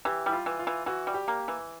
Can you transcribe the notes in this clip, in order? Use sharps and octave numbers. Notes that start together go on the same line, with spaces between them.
E3 G4
G3 E4
F4
E3
F4
E3
E3 F#4
G3
G4
A#3
E3